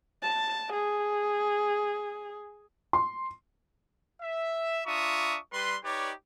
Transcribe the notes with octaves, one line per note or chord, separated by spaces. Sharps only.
A5
G#4
C6
E5
D4 F4 E5 A#5 C#6 D#6
G3 B4 C6
D#4 G4 B4 C#5 D5